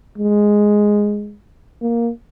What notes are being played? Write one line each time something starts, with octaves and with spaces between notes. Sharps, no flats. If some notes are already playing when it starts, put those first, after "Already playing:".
G#3
A#3